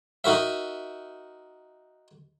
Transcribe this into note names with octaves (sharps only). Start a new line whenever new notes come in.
D#4 F#4 A#4 E5